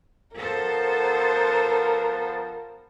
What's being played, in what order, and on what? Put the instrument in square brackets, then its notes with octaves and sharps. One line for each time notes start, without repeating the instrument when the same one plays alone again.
[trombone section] F3 B3 [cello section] A4 C5 [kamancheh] A#4